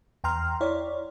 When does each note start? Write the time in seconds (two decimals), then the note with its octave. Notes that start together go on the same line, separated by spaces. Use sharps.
0.24 E2 G5 A#5 C6 F6
0.61 E4 C#5 D5